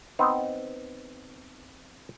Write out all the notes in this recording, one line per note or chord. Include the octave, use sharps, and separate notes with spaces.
B3 C4 D#4